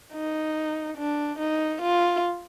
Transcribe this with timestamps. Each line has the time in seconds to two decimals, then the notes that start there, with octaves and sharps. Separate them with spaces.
0.13 D#4
0.97 D4
1.39 D#4
1.82 F4